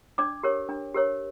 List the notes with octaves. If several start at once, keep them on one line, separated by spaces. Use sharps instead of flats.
D4 D5 D6
G4 A#4 C#5
D4
G4 A#4 C#5